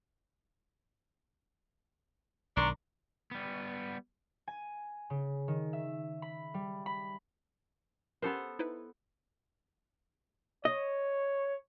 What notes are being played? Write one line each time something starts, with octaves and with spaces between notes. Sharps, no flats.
B1 D#3 D4 A#5 C6 C#6
G3 B3
G#5
C#3
D#3
E5
B5
G3
B5
B3 C#4 G4 A4 A#4 C5
D#4 E4 B4
C#5 D#5